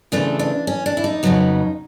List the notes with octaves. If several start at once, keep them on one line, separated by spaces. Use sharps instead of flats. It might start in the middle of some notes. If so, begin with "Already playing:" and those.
C#3 E3 A3 C4 D4
D4
C#4
D4
E4
D#4
F2 C#3 F#3 B3